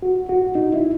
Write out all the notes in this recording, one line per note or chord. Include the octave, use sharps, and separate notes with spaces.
F#4
F#4
D#4
E4